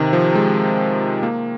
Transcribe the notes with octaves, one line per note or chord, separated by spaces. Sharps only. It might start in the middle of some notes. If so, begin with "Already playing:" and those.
Already playing: C3 D#3
F3
G#3
A#3